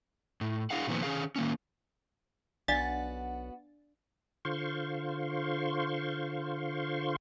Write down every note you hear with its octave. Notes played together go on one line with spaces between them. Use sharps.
A2
D4 E4 G#4 F5 F#5
A#2 D#3 F3 B3 C4
D#3 C#4 G#4 F5
D#3 A#3 C#4
B1 B3 D4 F#4 D5 F5 A6
D3 F4 C5 F5 C6 C#6